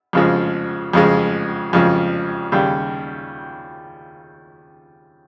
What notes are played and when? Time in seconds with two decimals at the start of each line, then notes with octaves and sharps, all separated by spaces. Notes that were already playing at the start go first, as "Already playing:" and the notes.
0.13 F2 C#3 F3 G#3
0.93 F2 C#3 F3 G#3
1.73 F2 C#3 F3 G#3
2.52 D#2 C#3 G3